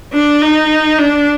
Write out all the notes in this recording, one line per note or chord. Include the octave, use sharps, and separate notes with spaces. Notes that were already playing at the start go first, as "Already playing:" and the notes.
D4
D#4
D4